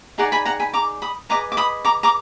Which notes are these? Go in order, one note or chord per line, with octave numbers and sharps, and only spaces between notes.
D#4 G#4 D5 F#5 A#5
G#5 B5
F#5 A#5
G#5 B5
A#5 D6
B5 D#6
G#4 B4 D#5 A#5 D6
D6
B5 D#6
A#5 D6
A#5 D6